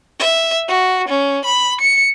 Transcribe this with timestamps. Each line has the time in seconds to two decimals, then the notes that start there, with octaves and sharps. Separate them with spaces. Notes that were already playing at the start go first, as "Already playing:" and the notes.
0.19 E5
0.68 F#4
1.08 C#4
1.45 B5
1.81 C#7